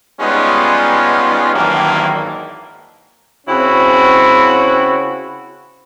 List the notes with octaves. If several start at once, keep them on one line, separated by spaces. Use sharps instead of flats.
G3 G#3 B3 C#4 D#4 F4
G#1 G2 D#3 E3 F#3 A#3
C#3 C4 C#4 E4 F#4